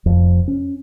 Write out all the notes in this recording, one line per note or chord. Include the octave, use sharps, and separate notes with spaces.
F1 F2
C#4